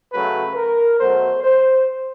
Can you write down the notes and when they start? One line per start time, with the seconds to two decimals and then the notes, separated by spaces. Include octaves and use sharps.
0.12 C#3 F#3 A3 B4
0.56 A#4
1.00 B2 F#3 A3 C5
1.44 C5